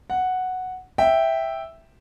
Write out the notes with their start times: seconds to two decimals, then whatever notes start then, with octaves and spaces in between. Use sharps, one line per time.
0.10 F#5
0.98 E5 G5